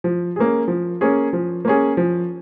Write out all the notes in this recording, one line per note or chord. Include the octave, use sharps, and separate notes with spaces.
F3
A#3 C#4 G#4
F3
A#3 C#4 G#4
F3
A#3 C#4 G#4
F3